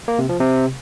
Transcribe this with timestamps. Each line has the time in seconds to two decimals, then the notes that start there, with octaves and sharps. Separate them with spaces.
0.08 A#3
0.19 C3
0.29 F3
0.40 C3